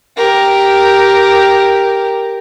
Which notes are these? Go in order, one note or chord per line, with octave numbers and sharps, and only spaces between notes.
G4 A#4